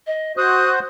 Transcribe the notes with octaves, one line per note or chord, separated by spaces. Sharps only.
D#5
F#4 C5 D#6 F#6